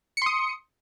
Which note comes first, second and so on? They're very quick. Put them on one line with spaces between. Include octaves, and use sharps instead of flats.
C#7 C6 D#6